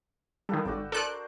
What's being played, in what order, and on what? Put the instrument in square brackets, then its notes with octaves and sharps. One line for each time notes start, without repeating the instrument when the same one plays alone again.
[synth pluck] D#3 G3 [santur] A4 B4 F5
[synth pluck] G#1 [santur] F#4 D5 G5
[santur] D4 A#4 C5 [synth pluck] A4 F#6 D7